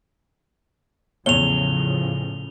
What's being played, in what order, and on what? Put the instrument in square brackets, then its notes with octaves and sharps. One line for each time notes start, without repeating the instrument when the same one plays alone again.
[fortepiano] E2 C#5 [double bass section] A2 C#3 F3 [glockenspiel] F7 G7